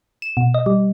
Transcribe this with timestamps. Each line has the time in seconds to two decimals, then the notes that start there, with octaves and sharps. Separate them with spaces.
0.22 E7
0.37 B2
0.54 D#5
0.66 G3